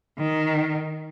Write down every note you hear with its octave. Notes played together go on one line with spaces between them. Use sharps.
D#3